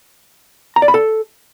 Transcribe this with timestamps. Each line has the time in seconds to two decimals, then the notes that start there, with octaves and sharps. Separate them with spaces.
0.76 A#5
0.82 D5
0.88 B5
0.94 A4